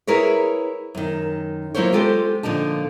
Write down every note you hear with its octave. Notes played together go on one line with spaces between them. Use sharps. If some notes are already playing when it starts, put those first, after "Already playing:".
E4 G#4 A#4 B4 C#5
F#2 D#3
F#3 A#3 E4 F4 C5 C#5
G#3 F4 G4 A4 C5
A#2 D3 F3 D#4 A5